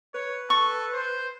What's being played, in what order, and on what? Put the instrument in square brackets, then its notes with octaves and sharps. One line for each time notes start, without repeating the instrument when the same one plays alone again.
[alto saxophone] B4 [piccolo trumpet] C#5
[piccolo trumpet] A4 [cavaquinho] C#6
[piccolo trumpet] C5